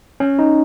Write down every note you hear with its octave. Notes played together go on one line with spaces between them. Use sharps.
C#4
D#4